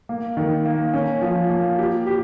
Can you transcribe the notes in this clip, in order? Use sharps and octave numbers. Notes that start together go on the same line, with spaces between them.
A#3
D#3
A#3
C#4
F3
A#3
G4
G4